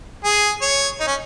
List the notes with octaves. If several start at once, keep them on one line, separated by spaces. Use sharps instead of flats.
G#4
C#5
D#4
C#4